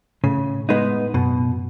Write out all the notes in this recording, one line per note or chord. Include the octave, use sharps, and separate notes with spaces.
A2 C#3
G#3 B3 D#4
F#2 B2